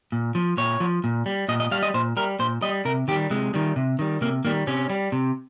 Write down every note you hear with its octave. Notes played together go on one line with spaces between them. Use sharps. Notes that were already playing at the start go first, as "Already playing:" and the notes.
A#2
F3
A#2 C#5
F3
A#2
G3
A#2 D#5
D#5
G3 F5
D#5
A#2 C5
G3 A#4
A#2 C5
G3 D#5
C3 A#4
D#3 G3 G4
C3 G#3
D#3 G3
C3
D#3 G3
C3 A#3
D#3 G3 A#3
C3 C#4
G3
C3